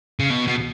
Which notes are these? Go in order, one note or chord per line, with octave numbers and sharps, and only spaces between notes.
C#3
B2
B2